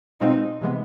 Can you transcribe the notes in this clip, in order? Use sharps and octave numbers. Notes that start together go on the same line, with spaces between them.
B2 G#3 C4 D#4 F4
C3 E3 G#3 B3